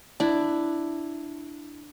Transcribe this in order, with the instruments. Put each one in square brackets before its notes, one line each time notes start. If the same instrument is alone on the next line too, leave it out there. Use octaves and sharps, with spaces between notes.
[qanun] D4 E4